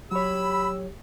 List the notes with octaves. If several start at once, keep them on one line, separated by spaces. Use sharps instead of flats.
F#3 G4 C#5 B5 E6